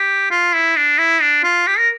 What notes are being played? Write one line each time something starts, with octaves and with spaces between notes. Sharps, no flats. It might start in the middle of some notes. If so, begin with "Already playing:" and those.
Already playing: G4
F4
E4
D4
E4
D4
F4
G4
A#4